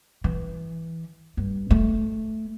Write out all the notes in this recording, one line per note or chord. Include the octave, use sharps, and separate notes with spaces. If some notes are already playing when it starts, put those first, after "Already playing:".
E3
G2
A3